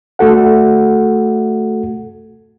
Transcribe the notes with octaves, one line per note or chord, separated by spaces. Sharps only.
A3 F#4 A4 F#5